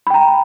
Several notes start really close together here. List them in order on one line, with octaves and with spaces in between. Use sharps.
B5 G5 A#5